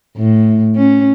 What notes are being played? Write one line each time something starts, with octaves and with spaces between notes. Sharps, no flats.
A2
C#4